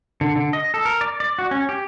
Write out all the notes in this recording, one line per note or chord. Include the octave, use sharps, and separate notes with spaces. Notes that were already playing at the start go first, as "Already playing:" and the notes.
D3
D3
D#5
A4
A#4
D5
D5
F#4
C#4
G4